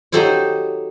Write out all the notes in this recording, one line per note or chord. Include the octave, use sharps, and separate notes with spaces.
D#4 F#4 G4 A4 C5 C#5